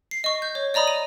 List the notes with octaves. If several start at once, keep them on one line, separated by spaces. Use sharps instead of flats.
C7
D#5 C#6
G6
C#5
D5 D#5 A#5 B5 D#6
D#7